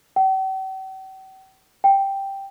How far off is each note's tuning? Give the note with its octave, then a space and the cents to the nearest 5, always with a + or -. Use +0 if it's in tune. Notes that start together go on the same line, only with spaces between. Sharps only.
G5 -45
G5 +0